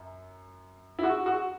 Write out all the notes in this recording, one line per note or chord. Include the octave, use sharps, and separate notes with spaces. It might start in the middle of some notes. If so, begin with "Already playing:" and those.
Already playing: F#2
E4
F#4
F#4